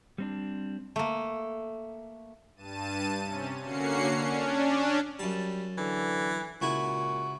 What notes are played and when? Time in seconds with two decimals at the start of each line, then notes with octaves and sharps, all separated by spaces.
0.18 G3 C4 D4
0.96 A3 A#3
2.56 G2 A5 D#7
3.22 C3 C#4
3.63 D3 A#3 C#4 F#4 C7 C#7
4.13 C#4 D4
5.19 F#2 G3 A5
5.78 D3 E3
6.62 C#2 A#2 E4 F#4 G#5